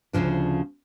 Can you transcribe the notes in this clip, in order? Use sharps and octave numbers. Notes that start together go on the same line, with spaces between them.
D2 G2 C#3 F3 D4